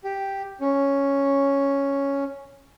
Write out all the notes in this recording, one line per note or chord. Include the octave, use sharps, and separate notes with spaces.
G4
C#4